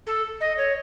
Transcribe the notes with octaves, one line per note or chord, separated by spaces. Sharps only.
A4
D#5
C#5